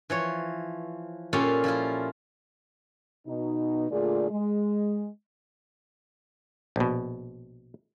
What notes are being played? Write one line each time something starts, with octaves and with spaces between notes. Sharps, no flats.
E3 F3 C#5
A#2 C#4 F4 G4 A4
F3 E4 F4
B2 D#4
A#2 D3 A3 F4 G#4 D5
G#3
A#1 B2